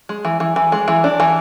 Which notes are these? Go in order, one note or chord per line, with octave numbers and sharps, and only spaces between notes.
G#3
E3
E3
E3
G#3
E3
D4
E3